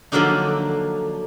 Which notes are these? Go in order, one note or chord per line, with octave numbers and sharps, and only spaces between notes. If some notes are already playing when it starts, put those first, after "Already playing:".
D3 F3 F#3 A#3 D4 D#4